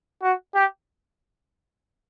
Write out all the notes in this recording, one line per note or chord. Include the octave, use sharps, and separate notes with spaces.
F#4
G4